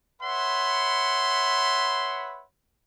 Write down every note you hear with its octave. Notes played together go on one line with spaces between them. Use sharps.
B4 C#5 E5 F#5 B5 C6